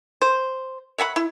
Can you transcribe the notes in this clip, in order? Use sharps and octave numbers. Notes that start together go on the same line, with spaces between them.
C5
C#5 E5 F#5 B5
E4